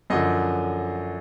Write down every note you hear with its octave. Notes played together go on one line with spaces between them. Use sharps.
F#2 D3 F3 D#5